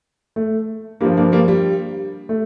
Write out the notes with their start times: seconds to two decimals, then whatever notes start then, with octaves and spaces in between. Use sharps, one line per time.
0.36 A3
1.01 G2 F3 G3 A#3
1.17 A#3 D4
1.32 G3 A#3
1.48 G3
2.29 A3